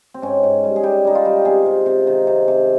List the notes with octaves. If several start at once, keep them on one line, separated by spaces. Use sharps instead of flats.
C4
G#2 C#4
G#2
G3
G#4
G3 G4
G3 D#4
F4
G3
C3 G#4
C3
C3
D#3
C3
C3